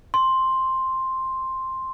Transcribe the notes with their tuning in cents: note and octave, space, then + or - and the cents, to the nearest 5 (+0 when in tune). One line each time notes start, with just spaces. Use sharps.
C6 +5